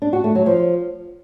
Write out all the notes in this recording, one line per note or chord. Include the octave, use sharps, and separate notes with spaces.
D4
F#4
A3
F#3
F3